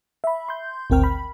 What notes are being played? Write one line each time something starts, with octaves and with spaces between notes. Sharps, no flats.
E5 B5
C6 G6
G#1 D2 C4 A#4 G5 F6
B5